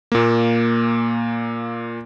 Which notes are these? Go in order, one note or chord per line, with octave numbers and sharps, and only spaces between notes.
A#2 A#3